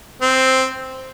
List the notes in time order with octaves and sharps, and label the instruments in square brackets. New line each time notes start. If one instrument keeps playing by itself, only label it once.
[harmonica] C4